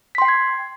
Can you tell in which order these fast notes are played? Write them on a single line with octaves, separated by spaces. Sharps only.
B6 C6 G5 C7 G#6